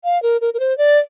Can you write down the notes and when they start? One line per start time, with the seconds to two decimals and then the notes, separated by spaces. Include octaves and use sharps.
0.04 F5
0.23 A#4
0.41 A#4
0.54 A#4
0.60 C5
0.78 D5